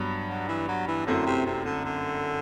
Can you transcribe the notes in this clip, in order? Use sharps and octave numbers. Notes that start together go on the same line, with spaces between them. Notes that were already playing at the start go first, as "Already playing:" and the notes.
Already playing: G2 F#3 B3
F#3
E3
F#3
E3
F#2 D3 F#3 A3 C4 E4
C3
C3
D3
D3